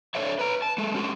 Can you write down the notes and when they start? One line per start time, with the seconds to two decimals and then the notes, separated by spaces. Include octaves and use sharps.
0.15 D4 A4 C#5 D5 E5
0.39 B4 A#5
0.62 A5
0.78 G#3 A4
0.94 C#4 F#4 G4